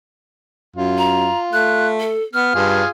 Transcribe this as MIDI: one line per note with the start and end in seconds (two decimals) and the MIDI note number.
0.76 1.30 42
0.76 2.01 65
0.98 1.39 82
1.53 2.14 57
1.53 1.87 90
2.00 2.23 69
2.34 2.51 59
2.34 2.87 89
2.55 2.82 43
2.55 2.87 65
2.55 2.87 68